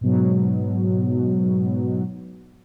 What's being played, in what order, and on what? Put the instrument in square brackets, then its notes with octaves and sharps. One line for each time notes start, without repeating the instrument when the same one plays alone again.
[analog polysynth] G#2 B2 F#3